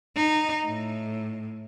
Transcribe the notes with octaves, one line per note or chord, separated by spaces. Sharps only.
D#4
A2